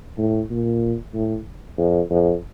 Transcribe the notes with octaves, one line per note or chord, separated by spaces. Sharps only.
A2
A#2
A2
F2
F2